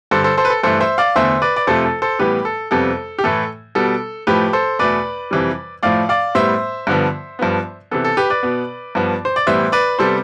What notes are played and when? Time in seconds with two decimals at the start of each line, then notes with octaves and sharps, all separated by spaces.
0.11 G2 D3 G3 A4 C5
0.24 A4 C5
0.37 A4 C5
0.45 B4
0.50 A4
0.63 G2 E3 A3 A4 C5
0.80 C5 E5
0.98 D5 F5
1.16 E2 D3 A3 C5 E5
1.42 B4 D5
1.56 D5
1.67 F2 C3 F3 A3 A4 C5
1.85 A4
2.02 A4 C5
2.19 A2 E3 G3 B3 G4 B4
2.45 A4
2.71 F2 C3 G3 B3 A4
3.19 G4
3.24 A2 E3 A3 A4
3.75 B2 G3 B3 A4
4.27 A2 F3 A3 G4 B4
4.53 A4 C5
4.79 E2 B2 A3 B4 D5
5.31 F2 C3 E3 G3
5.83 A2 F3 A3 D5 F5
6.09 D5 F5
6.35 A2 G3 B3 C5 E5
6.87 G2 D3 F3 B3
7.39 G2 F3 B3
7.91 C3 E3 B3 A4
8.04 A4
8.17 G4 B4
8.30 B4 D5
8.43 B2 B3
8.95 G2 F3 B3
9.25 C5
9.36 D5
9.47 A2 E3 G3 B3 C5 E5
9.72 B4 D5
9.99 C3 G3 B3 A4 C5